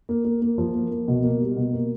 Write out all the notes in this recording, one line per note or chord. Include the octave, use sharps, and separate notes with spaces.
A#3
A#3
A#3
F3
A#3
A#3
B2
A#3
G3
B2
A#3